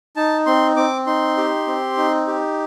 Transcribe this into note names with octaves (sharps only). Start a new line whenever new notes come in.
D#4 A5
C4 C6
C4 D6
D#4 C6
G4
C4
D#4
G4